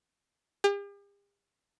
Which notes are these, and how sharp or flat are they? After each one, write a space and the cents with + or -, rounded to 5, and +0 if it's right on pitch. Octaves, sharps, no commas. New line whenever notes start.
G4 +45